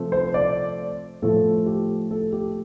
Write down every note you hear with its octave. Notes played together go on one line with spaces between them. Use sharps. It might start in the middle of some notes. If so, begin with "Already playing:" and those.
Already playing: C3 F3 A3
C5
D5
A2 F3 A3 A4
G4
A4
G4